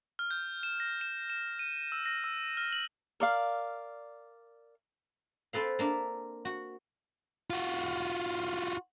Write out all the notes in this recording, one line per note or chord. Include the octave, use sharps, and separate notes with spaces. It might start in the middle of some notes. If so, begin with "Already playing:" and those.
F6
G6
E7
A#6
E7
E7
D#7
E6
A#6
E6
F6
F#7
A#4 D5 F5
C4 A4 B4 F5
A#3 D4 E5
F#4
F4 F#4